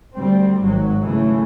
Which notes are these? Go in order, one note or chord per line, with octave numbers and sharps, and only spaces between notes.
D2 G3 C4
G#1 F#3
C#3 E3 A3